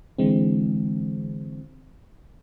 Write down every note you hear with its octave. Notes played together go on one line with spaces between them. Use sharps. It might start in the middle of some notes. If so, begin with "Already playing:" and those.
D3 E3 G#3 C4